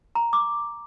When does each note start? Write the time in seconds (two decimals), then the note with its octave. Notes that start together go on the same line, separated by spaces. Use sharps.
0.15 A#5
0.33 D6